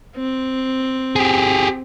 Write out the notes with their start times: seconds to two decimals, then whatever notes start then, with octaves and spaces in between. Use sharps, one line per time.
0.17 C4
1.16 G4 G#4